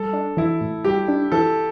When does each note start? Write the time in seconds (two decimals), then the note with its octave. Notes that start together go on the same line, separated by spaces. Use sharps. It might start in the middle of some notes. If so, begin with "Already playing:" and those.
Already playing: G3 A4
0.13 D4
0.37 E3 E4
0.61 A2
0.84 G3 G4
1.08 D4
1.32 E3 A4